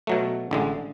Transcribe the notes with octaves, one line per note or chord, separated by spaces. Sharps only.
B2 F#3 A3
A1 D3 G#3